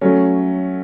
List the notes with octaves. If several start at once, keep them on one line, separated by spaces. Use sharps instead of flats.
F#3 A3 C#4